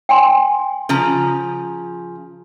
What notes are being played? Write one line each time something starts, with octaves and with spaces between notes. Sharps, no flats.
G5 G#5 C6
C#3 F3 A#5